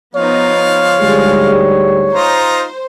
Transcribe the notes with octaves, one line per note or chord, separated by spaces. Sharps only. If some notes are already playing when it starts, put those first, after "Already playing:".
F3 B3 D#4 C#5 F5
D2 G#2 G3 G#3
D#4 F4 C5 A#5